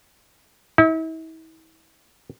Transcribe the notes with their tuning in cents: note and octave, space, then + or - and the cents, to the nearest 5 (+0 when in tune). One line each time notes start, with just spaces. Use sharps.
E4 -40